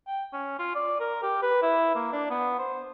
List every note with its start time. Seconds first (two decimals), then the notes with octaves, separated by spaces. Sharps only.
0.07 G5
0.33 C#4
0.59 F4
0.75 D5
1.00 A#4
1.23 G4
1.43 B4
1.62 E4
1.95 A#3
2.13 D4
2.30 B3
2.59 C5